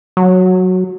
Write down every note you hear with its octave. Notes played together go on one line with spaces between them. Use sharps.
F#3